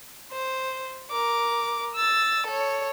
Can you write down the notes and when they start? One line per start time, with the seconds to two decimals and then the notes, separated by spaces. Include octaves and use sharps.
0.31 C5
1.11 A#4 D6
1.95 E6 A6
2.47 A4 C#5